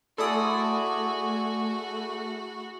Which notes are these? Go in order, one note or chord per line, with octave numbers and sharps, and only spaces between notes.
A3 E4 F#4 G#4 A4 D5 C6 D#6